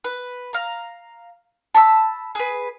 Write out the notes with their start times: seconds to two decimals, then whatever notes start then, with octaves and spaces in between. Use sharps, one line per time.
0.04 B4
0.53 F5 A#5
1.74 A5 B5 C#6 E6
2.35 G#4 B4